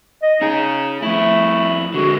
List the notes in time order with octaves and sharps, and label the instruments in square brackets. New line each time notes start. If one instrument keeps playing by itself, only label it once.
[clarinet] D#5
[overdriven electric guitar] C#4 G#4 [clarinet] D#4
[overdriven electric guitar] F2 E4 [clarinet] A3
[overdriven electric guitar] D3 G#3 [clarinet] F#4